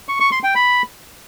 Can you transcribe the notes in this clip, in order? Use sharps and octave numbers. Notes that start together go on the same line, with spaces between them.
C#6
C#6
C6
G5
B5